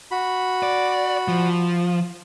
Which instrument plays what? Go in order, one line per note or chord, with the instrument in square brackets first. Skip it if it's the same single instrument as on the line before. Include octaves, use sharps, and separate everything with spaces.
[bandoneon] F#4 B5
[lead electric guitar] D5
F3